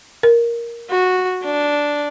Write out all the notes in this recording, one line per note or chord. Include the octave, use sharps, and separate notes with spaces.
A#4
F#4
D4